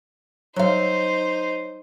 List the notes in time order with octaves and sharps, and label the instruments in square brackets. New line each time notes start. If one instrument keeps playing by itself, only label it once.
[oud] F#3 F5 [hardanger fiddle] D#4 C5